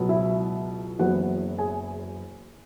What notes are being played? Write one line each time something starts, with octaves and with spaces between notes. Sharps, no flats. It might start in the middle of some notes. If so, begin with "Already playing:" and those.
Already playing: C#2 B2 F#3 B3
E4 E5
F#1 F#2 E3 B3 F#4 F#5
G#4 G#5